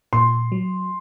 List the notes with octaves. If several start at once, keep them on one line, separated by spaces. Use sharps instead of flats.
A#2 C6
F#3